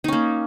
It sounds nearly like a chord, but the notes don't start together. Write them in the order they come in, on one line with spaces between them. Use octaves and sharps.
D#4 C#4 A#3